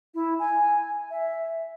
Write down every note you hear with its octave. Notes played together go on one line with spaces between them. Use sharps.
E4
G#5
E5